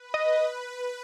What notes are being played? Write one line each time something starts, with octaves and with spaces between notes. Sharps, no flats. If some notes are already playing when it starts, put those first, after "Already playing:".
Already playing: B4
D#5